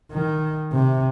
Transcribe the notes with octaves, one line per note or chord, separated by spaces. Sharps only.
D#3
C3